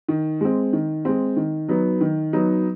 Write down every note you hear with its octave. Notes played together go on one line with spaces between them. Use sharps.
D#3
G#3 C4
D#3
G#3 C4
D#3
F#3 B3 D#4
D#3
F#3 B3 D#4